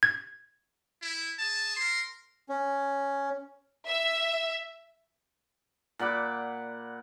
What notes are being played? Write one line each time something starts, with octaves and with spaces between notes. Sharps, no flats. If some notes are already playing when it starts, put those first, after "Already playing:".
G#6
E4
G#4 A5
A#4 C6
C#4
E5
A#2 F#5 B5 D6